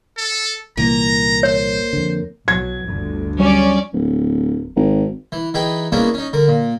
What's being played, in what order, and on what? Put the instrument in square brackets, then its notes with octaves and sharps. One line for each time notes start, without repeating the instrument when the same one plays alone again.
[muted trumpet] A4
[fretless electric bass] C2 A#2 E3 [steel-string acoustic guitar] A#3 [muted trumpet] A#5
[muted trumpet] C5 [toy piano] C#5
[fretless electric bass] F2 D3
[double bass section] B1 F#3 [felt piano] G#6
[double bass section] G1 D2 D3
[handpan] F#3 G3 C#5 [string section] C#4 D5
[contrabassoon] D1
G#1
[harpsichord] E3
E3 D#4 G#4 G5 B5
G#3 A#3 B3 C#4 D4 E4
C#4 D#4
D3 A#4
A#2